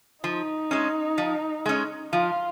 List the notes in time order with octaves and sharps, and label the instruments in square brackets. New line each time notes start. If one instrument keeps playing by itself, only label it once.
[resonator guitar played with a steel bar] F3 [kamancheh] D#4
[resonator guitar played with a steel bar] G#3 C#4
F3
G#3 C#4
[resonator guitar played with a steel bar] F3 [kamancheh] F4